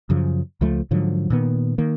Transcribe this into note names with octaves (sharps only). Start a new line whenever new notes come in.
F#2 C#3 F3
C#2 F3 A3
G#2 D3 F3 F#3
A#2 D#3 B3
D#3 A#3